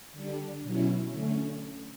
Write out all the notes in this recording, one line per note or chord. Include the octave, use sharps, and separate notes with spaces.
D3 G3 D4
B2 F#3 C#4 E4
D3 A3 C#4